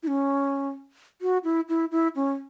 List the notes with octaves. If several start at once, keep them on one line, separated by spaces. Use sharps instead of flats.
E4
C#4
F#4
E4
E4
E4
C#4